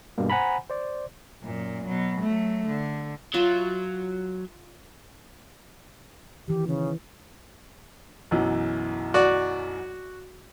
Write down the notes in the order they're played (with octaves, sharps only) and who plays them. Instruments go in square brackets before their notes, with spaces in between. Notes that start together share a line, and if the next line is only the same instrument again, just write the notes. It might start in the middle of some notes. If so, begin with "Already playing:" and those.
[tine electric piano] G2 B2 G3 A#3
C5 F#5 G#5 A#5 B5
C5 D5
[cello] F#2 A#2
B2 F#3
F#3 A3
D3
[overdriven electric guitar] F#3 [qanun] F4 E5
[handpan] D#3 E3 [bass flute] G4
[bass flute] C#3
[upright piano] B1 F#2 E3
[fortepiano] F#4 D5